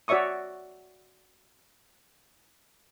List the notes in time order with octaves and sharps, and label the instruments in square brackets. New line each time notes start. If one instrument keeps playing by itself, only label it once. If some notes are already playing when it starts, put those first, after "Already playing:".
[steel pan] F#4 C#5 D5 E5 C#6 D#6